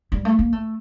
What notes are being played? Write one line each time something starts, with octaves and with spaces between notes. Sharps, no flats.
G3
A3
A#3
A3